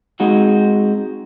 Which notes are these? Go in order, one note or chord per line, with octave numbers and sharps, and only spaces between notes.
G#3 C4 D#4 F#4